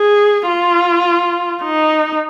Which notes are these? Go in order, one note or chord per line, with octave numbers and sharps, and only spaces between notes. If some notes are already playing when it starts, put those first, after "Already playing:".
Already playing: G#4
F4
D#4